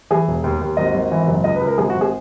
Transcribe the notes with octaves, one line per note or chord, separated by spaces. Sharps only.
E3 G#4
E1
D#2
D#2
G#1 D#5
G#1
E3
F#1
C#2 D#5
B4
C#2
A#4
G#1 G#4
F#4
G#1
G#4